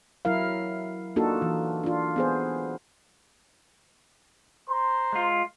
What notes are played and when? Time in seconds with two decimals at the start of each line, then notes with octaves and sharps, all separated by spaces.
0.25 F#3 E4 A#4 F5
1.16 A#3 D4 D#4 F4 F#4 A4
1.42 E3
1.84 D4 F4
2.16 B3 G#4 C5
4.69 C5 A#5 C6
5.13 G#3 F4